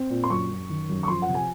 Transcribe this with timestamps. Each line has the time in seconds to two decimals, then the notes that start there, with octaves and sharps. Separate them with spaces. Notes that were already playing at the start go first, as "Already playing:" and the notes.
Already playing: C4
0.10 A#2
0.24 C6
0.30 F#2 C#6
0.50 F#2
0.69 D#3
0.89 F#2
1.03 C#6
1.08 F3 C6
1.22 F#5
1.28 C3
1.34 G#5